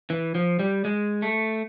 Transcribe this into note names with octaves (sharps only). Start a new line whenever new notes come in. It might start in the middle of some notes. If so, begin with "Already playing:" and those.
E3
F3
G3
G#3
A3